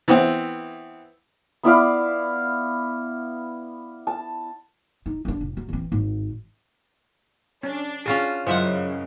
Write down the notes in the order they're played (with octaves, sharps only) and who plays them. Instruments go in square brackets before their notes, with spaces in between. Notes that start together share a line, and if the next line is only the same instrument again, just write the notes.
[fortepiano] E3 B3 C4
[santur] B3 E4 D5 F5
A5
[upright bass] D#4
C#4 D4
F1
F#3
E3 C4
G#1
[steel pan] C#4 [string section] D4
[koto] C#4 F4 F#4 [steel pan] G#4
[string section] F#2 C#3 [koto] G#3 E5 F#5 [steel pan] E4 F4 C5